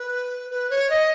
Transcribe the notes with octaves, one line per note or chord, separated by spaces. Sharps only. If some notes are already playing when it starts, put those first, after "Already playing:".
Already playing: B4
B4
C#5
D#5